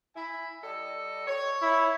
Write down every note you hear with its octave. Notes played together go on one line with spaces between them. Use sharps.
E4 G#5
G3 A4 D#5
C#5
E4